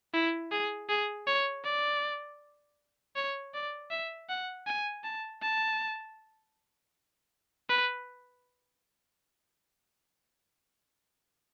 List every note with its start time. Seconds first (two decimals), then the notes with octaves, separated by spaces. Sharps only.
0.13 E4
0.51 G#4
0.89 G#4
1.27 C#5
1.64 D5
3.16 C#5
3.54 D5
3.91 E5
4.29 F#5
4.67 G#5
5.04 A5
5.42 A5
7.69 B4